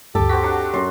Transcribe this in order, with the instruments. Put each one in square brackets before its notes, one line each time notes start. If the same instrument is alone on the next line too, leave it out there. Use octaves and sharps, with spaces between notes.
[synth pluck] D2 G2 [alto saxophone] G4 [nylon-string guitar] A4
[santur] C4 F#4 [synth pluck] B6
[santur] F#3 D4
[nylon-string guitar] F#2 [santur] C6